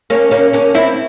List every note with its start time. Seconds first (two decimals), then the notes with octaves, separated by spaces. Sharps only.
0.10 A#3 C#4
0.31 A#3 C#4
0.53 A#3 C#4
0.74 C4 E4